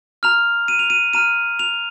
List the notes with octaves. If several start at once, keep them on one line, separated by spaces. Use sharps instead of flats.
A#5 F6 F7
D#7
F7
D#7
A#5 F6 D#7
F7